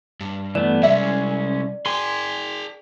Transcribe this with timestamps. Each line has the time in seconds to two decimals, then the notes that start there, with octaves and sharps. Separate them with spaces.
0.20 G2
0.55 E3 A3 B3 D5
0.83 C3 G3 G#3 C#4 E5
1.86 G#4 G5 G#5 C6